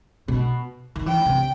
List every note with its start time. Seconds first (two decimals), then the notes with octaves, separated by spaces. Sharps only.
0.28 B2
0.96 D#3
1.06 E3 G5
1.26 C3